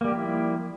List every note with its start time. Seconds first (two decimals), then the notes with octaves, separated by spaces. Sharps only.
0.01 A#3
0.04 G3
0.08 G4
0.11 F3
0.15 E4